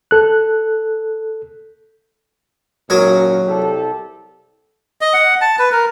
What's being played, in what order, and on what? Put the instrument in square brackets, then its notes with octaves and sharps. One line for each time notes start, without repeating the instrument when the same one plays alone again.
[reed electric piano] A4 F#6
[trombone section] G#1 F#2 A#2 [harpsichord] F#3 G#4 A#4
[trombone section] C2 G4 A4
[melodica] D#5
F#5
A5
B4
A#4